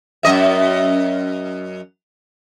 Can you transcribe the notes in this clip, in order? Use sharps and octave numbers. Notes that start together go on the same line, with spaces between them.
F#2 D#5 E5